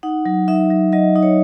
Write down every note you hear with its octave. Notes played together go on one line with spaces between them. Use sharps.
D#4 F#5
F#3
D#4 E5
F#3
F#3 D#5
D#4
C#5